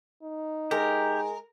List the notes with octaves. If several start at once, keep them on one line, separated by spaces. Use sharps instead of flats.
D#4
G#3 G4 A#4